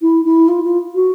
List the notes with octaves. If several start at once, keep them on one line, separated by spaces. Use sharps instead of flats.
E4
E4
F4
F4
F#4